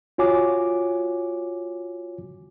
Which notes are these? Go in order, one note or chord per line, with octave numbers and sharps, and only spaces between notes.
F4 F#4 C#5 G#5 D6